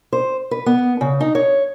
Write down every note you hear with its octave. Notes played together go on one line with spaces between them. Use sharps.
C5
B4
B3
C#3
D#4
C#5